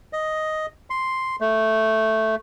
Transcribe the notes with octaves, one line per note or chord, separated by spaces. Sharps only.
D#5
C6
A3